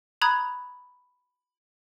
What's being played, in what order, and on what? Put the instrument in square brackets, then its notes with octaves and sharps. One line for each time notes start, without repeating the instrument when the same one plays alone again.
[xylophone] A#5 B5 D#6 F#6 G#6